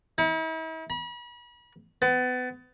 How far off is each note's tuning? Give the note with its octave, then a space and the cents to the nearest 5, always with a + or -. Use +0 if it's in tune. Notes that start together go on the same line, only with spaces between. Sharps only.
E4 -45
B5 -40
B3 +30